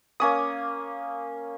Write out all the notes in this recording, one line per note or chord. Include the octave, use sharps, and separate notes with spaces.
A#3 C#4 D#6